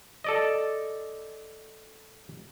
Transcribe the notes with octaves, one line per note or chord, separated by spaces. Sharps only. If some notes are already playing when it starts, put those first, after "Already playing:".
A4 D5 D#5